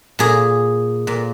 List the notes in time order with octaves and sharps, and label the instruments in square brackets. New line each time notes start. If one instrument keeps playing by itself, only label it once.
[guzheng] A#2 G#4
A#2